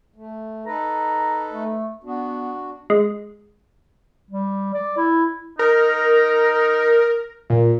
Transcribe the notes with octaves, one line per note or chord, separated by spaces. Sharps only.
A3
D#4 A4 B4 A#5
A3
B3 D4 F#4
G#3
G3
D5
E4
D#4 A#4
A#2